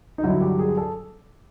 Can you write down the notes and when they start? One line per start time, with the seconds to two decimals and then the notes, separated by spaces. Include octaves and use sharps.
0.18 D#4
0.23 G2 D3 F#3 E4
0.41 G4
0.59 G#4
0.77 A4